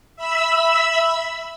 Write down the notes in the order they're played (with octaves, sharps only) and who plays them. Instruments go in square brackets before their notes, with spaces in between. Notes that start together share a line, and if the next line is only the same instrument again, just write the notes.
[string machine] E5 B5 E6